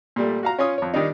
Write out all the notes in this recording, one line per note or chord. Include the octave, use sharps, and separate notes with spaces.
A#2 G3 A3
F#4 F5 A#5
C#4 F4 C#5 D#6
F2 C#5
D#3 G3 D4 D#4